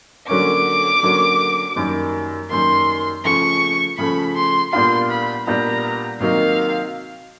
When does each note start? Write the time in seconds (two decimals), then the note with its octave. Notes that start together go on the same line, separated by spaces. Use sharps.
0.28 D3 F#3 A#3 C#4 D6
1.03 D3 F#3 A#3 C#4
1.76 F#2 D#3 G3 A#3
2.50 F#2 D#3 G3 A#3 C6
3.25 C#3 F3 A3 C#6
3.98 C#3 F3 A3 B5
4.35 C6
4.72 A#2 G3 B3 D4 F4 C6
5.10 B5
5.46 A#2 G3 B3 D4 F4 A#5
6.20 C3 D#3 F#3 A#3 D#4 F5